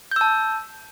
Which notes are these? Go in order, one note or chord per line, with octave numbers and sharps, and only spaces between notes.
A5 E6 G6